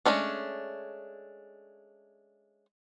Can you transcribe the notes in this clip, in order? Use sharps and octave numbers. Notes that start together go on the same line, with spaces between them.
G#3 A3 C#4 D4